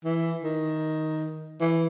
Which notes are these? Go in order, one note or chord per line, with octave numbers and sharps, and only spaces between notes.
E3
D#3
E3